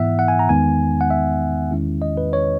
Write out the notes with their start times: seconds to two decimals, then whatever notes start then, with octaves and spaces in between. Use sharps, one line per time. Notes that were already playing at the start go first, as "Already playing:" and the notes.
Already playing: G#2 E3 B3 E4 E5 F#5
0.19 F#5
0.28 G#5
0.39 A#5
0.49 E2 D#3 G#3 B3 D#4 G#5
1.01 F#5
1.10 E5
1.71 E2 D#3 G#3 C#4 E4
2.02 D#5
2.17 B4
2.33 C#5